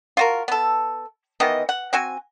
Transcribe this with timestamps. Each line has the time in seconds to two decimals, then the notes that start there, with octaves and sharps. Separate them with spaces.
0.17 F4 F#4 A#4
0.48 B3 A4
1.40 D#3 E3 B3 D#5
1.69 F#5
1.93 C4 F#4 G#5